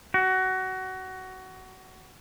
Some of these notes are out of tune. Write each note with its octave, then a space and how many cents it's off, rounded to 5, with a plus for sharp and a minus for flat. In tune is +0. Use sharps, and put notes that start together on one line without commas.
F#4 +20